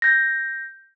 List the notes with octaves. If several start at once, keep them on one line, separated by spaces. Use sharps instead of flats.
G6 A#6